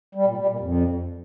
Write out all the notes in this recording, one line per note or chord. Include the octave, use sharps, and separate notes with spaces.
G3
A#2
G3
A#2
F2